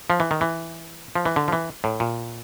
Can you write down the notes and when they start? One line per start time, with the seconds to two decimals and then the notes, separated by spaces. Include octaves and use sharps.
0.10 F3
0.20 E3
0.31 D#3
0.41 E3
1.15 F3
1.25 E3
1.36 D3
1.48 F3
1.52 E3
1.84 A2
2.00 A#2